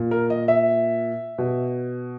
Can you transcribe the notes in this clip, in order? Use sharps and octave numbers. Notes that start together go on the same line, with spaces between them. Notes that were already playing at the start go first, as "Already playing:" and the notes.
Already playing: A#2
A#4
D#5
E5
B2